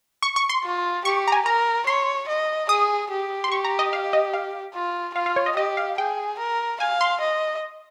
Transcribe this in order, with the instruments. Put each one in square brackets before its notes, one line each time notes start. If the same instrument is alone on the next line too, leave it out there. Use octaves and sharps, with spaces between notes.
[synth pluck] C#6
C#6
C6
[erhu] F4
[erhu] G4 [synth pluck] C#6
[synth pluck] A#5
G#5
[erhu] A#4 [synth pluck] A#5
[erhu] C#5 [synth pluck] C6
[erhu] D#5
[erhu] G#4 [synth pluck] D#6
[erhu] G4
[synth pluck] C6
[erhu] G4 [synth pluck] C#6
[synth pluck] A#5
D#5
F5
D#5
F5
[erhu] F4
[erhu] F4 [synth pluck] F5
[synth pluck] F5
C#5
D#5
[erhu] G4 [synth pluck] D#5
[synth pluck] F5
[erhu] G#4 [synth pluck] G5
[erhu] A#4
[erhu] F5 [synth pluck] G#5
[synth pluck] C6
[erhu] D#5